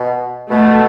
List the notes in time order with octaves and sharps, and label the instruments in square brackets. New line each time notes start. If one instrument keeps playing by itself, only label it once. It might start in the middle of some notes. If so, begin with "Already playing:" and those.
Already playing: [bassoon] B2
[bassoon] B2 [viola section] A3